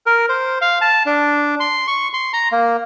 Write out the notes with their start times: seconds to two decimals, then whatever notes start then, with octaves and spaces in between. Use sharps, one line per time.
0.06 A#4
0.29 C5
0.61 F5
0.81 A5
1.06 D4
1.60 C6
1.88 C#6
2.14 C6
2.33 A#5
2.52 A#3